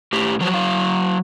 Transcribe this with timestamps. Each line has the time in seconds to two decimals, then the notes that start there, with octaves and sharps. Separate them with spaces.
0.13 A2 G4
0.40 F3 F#3
0.53 F#3 F5